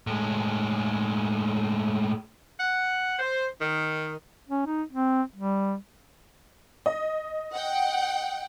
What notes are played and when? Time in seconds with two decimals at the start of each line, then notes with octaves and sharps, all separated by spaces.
0.07 A2 G#3
2.60 F#5
3.19 C5
3.61 D#3
4.49 C#4
4.66 D#4
4.92 C4
5.35 G3
6.86 D#5
7.53 F#5 G5